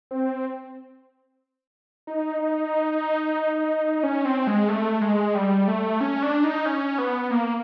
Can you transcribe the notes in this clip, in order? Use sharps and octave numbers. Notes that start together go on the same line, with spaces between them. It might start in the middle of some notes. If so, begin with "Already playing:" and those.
C4
D#4
D#4
C#4
C4
G#3
A3
G#3
G3
A3
C#4
D4
D#4
C#4
B3
A#3